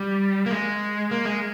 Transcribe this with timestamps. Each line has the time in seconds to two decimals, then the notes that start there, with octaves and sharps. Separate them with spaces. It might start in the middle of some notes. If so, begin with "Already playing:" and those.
Already playing: G3
0.46 A#3
0.51 G#3
1.11 A#3
1.25 G#3